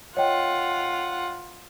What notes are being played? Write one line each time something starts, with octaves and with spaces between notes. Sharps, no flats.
F4 C#5 D#5 F#5 G5